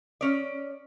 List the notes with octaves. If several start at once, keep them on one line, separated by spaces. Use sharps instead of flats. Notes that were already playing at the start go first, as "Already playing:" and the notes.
C#4 D5